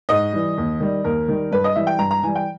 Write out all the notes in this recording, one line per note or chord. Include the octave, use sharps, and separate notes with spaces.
G#2 D#5
E3 G3
D#2
D#3 G3
D#2 A#4
D#3 G3
G2 B4
D#5
E3 G3 E5
G5
G2 A#5
A#5
E3 G3 G#5
G5